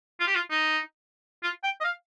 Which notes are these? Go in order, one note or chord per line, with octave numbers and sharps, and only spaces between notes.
F4
G4
F4
D#4
F4
G5
D#5
F5